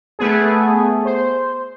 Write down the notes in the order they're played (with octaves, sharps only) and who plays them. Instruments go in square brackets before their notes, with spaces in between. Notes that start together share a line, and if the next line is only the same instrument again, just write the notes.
[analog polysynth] A3 B3 G#4
C5